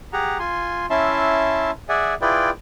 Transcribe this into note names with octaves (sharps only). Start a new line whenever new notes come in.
G4 G#4 F#5 A#5
F4 G#5 C6
C#4 E4 E5 A5 C6
G#4 D5 E5 F#5 G#5
E4 F4 G#4 B4 D5 G5